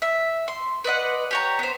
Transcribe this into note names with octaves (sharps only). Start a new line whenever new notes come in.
E5
C6
B4 D5 D#5 F#5
G4 C#5 A#5
B3 C5